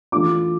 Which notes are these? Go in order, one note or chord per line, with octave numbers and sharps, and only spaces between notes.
E3 A3 D4 F4 D6